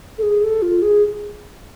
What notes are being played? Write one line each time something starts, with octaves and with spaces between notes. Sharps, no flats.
A4
G#4
A4
F4
G#4